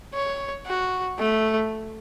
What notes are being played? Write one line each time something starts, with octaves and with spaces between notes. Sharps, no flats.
C#5
F#4
A3